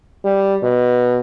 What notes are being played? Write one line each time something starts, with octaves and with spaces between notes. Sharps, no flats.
G3
B2